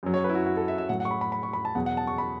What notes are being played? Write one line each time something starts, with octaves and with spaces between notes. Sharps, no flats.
F#2 F#3
C#5
B4
E4
F#4
F#4
A4
E5
E5
A2 F#3 F#5
F#5
C#6
B5
B5
B5
C#6
B5
A5
E2 B2 F#3 F#5
F#5
A5
C#6
B5